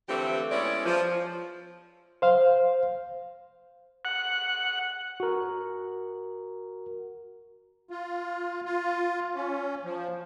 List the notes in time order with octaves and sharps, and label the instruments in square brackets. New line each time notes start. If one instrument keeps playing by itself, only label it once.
[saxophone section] D3 E3 F3 A3 C4 G4
G#3 B3 C#4 E4 D5
F3
[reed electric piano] C5 F5
[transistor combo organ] F#5
[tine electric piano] F#4 A#4
[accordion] F4
F4
C#4
F3